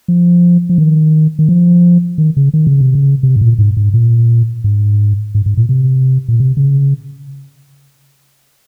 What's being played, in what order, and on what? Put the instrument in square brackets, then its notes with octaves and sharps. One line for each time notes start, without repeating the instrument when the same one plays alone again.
[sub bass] F3
F3
D#3
D#3
F3
D#3
C#3
D#3
C#3
C3
C#3
C3
G#2
A#2
G#2
G#2
A#2
G#2
G#2
G#2
A#2
C3
A#2
C3
C#3